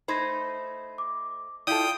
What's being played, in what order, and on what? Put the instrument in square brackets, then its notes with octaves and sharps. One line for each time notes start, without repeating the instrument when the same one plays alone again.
[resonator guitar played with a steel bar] A3 D#4 C5 [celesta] B5 G#6 A#6
[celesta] D6
[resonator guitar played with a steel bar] E4 F4 A4 [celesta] D5 [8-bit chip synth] G5 D#6